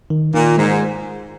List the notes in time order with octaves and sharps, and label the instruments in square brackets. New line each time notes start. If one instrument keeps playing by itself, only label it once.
[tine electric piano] D#3
[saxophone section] A#2 [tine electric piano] D#3
[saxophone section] G#2 [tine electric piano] G#3